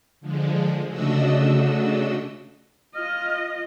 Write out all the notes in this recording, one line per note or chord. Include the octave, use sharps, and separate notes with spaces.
D3 F3 G#3
C#3 A3 D4 F#4 D#5 E6
F4 D#5 F6